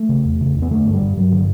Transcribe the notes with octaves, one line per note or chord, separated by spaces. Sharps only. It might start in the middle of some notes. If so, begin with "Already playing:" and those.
Already playing: A3
C#3
E2
C#3
E2
B3
D3 A3
G2
G3
G2
G2 F#3
D3